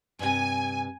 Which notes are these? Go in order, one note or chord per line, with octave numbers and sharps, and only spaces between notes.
G2 C3 G#5